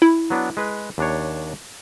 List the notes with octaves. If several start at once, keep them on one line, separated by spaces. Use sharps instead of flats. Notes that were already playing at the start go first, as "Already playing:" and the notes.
E4
F#3 B3 D4
G#3 B4
D#2 D4 C#5